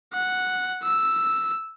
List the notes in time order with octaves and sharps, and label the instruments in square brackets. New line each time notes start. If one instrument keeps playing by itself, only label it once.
[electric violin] F#5
E6